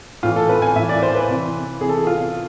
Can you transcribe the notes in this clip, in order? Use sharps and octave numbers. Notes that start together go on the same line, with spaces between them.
A2 E3 F4
A4
B4
G#5
A2 E3 E5
D5
C5
B4
C3 E3
C3 E3 G#4
A4
G#4
F4